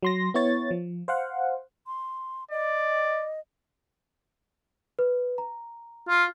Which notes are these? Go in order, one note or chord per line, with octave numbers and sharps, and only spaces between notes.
F#3 C6 A#6
B3 E4 C#5 A6
F3
C5 F5 F#5
C6
D5 D#5
B4
A#5
F4